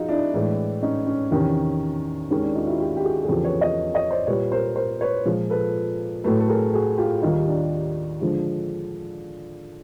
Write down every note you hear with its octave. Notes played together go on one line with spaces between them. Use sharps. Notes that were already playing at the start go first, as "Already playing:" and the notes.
Already playing: F3 D#4 F4 F#4 G#4
D4 E4
A2 E3 G#3
C#4 D#4
C#4
E2 C3 D#3 C#4
D#2 D#3 G#3 C#4
D4
D#4 F4
E4 F#4
F4 G4
G4
F#4 G#4
G#4
E2 C#3 F3 G4 A4
B4 C#5
C#5 D#5
C#5 D#5
C5 D5
A#2 G3 B4 C#5
A#4 C5
A#4 C5
B4 C#5
A#2 F3 G#3
A4 B4
A2 F#3 A3 A4 B4
A4
G#4 A#4
F#4 G#4
F4 G4
D#2 D#3 G3 D#4 F4
D4
D3 F3 G#3